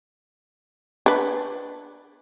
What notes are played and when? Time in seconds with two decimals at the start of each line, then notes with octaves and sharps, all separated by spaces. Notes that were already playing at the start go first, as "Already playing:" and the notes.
1.06 D4 B4